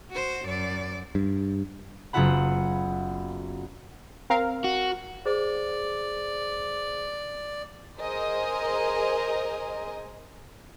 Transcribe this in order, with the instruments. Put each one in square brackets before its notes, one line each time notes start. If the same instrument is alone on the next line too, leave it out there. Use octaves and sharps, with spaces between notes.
[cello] F#4 C5
F#2 D5
[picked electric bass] G2
[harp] F#1 B3 F4 E5 F#5 B5
[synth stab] C4 A#4 F5
[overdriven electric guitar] F#4
[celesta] G#4 C5 [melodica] D5
[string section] G#4 A#4 C5 D#5 G#5